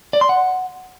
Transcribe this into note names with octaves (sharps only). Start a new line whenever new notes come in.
D5
C6
F#5